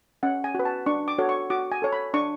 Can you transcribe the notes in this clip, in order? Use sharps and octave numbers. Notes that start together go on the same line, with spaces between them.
C#4 F#5
G#5
F#4 B4
A5
D4 C#6
D6
F#4 A4 C#5
C#6
F#4 D6
G#5
A4 C#5
B5
D4 C#6